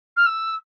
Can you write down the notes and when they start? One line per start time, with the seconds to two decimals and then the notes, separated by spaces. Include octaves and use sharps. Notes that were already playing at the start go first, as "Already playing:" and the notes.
0.17 F6
0.26 E6